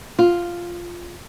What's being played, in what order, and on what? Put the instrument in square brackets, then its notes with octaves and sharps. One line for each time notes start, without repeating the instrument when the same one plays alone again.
[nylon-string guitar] F4